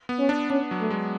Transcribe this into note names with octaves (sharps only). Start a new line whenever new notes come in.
B3
C#4
D4
C#4 D4
F#3
A3
G#3